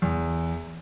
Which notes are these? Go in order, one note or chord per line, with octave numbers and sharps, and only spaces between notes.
E2